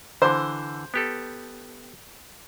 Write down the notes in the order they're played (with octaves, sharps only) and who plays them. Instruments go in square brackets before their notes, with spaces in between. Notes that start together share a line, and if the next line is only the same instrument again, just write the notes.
[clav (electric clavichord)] D3 E3 [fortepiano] C5
[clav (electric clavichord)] B3 G4 A4